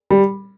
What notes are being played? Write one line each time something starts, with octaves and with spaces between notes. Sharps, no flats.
G3